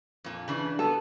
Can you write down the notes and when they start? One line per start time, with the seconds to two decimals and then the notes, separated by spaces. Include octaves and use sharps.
0.24 F2 A#2
0.48 C#3 E3 D4
0.79 B3 A4